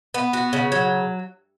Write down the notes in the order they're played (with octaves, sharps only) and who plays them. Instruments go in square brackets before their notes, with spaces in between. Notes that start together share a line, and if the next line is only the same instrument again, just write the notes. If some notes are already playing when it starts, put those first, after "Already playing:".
[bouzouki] B3
F#4
C#3
F#3